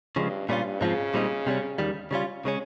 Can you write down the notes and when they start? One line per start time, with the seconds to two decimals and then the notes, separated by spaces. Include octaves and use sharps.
0.16 G2 C#3 F3 G#3
0.49 G2 A#2 G3 C#4 F4
0.81 G#2 C#3 F3 C4 F4
1.14 A#2 G3 C4 D#4
1.47 C3 G3 C#4
1.78 D#2 D#3 G3
2.11 C#3 G3 C#4 F4
2.45 C#3 G#3 C#4